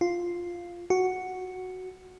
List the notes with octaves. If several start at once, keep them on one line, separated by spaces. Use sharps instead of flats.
F4
F#4